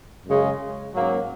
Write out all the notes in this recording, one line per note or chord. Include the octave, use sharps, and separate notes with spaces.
F#2 C#3 G#3
G#2 F#3 A#3 C#4